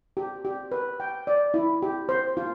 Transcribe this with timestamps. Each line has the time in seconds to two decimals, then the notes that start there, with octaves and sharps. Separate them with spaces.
0.17 G4
0.45 G4
0.72 B4
1.00 G5
1.27 D5
1.54 E4
1.82 G4
2.09 C5
2.37 F4